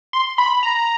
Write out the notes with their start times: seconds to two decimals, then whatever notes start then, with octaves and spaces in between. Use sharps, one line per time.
0.13 C6
0.38 B5
0.63 A#5